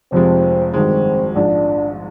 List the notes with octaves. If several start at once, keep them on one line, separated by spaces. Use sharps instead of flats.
F1 F2 C3 F3 G#3 C4
G#1 G2 D#3 G#3 C4
A#1 G#2 F3 D4